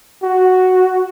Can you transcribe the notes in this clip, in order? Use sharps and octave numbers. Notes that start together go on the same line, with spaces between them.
F#4